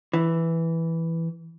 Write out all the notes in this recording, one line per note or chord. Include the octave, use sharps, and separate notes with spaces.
E3